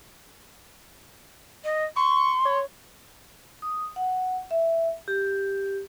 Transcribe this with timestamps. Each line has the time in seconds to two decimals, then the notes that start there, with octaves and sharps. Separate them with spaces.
1.64 D#5
1.96 C6 C#6
2.45 C#5
3.62 D#6
3.96 F#5
4.51 E5
5.08 G4